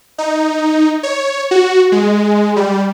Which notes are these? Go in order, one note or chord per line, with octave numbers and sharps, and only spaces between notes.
D#4
C#5
F#4
G#3
G3